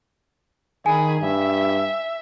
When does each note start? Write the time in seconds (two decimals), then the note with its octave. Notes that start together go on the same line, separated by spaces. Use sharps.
0.86 D#3 G#4 G#5 B5
1.20 G2 E5